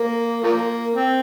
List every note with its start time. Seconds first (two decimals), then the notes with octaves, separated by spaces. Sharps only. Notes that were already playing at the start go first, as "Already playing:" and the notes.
Already playing: A#3
0.44 F3 A#3
0.95 C4